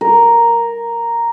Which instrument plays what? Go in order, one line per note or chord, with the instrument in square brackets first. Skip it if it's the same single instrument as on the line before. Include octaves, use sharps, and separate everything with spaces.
[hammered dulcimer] A#4